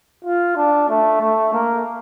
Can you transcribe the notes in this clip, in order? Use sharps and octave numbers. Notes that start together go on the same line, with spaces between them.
F4
D4
A3
A3
A#3